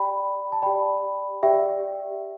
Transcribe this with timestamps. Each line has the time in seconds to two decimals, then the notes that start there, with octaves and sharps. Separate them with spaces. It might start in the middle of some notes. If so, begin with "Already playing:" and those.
Already playing: G4 D5 G5 B5
0.52 A5
0.62 G4 D5 G5 B5
1.43 G4 D5 E5 G5